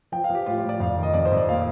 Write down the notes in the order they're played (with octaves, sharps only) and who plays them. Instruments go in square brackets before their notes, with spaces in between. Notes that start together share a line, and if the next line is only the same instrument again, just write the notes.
[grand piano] F3 G5
F5
F3
G4
A2 F4
F4
A2
D5
F2 F5
D#3
D#5
F2 D5
C5
F2
D5
A#2 F5